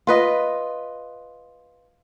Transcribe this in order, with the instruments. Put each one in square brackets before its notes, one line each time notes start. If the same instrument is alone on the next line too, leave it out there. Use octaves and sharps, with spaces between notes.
[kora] F4 B4 D#5